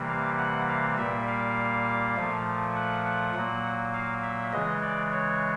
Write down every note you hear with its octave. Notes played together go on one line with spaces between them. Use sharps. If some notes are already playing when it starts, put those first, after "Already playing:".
Already playing: C3 E3 G3 A#3
F5
F#5
F5
A#2 G3 A#3 E5
F5
A#2 F3 A3
F#5
F#5
A#2 F#3 A#3
F5
E5
C#3 E3 G#3 D#5
D5
C#5